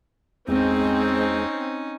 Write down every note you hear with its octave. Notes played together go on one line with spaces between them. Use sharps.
E2 G#3 C4 C#4 D#4